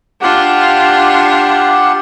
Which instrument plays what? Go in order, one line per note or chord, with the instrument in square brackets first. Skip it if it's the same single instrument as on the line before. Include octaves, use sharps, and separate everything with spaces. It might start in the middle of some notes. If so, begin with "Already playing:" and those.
[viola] D4 F4 [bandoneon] G4 F#5